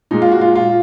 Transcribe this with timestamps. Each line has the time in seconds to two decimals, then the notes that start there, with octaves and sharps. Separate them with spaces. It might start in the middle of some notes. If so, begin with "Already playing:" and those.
0.11 A#2 G#3 D#4
0.22 F4
0.32 F#4
0.41 F4
0.56 F4